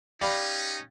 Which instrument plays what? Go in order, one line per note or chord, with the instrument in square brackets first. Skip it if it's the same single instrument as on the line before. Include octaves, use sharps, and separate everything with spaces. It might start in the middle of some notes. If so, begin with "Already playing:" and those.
[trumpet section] C#4 D#4 [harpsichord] G4 F5 [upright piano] D5 B5